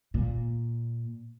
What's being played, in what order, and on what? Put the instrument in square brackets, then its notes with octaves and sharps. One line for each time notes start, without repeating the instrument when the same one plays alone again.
[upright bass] A#2